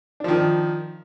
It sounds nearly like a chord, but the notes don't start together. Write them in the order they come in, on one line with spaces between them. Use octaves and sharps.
D4 F3 D#3